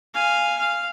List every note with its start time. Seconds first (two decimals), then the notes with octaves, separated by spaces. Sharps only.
0.14 F5 G#5
0.58 F5